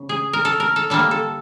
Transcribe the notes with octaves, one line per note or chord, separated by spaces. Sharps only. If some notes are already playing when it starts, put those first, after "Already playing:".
Already playing: C#3
G#4
A#4
A4
A#4
A4
D3 G3 A#3 A4
A4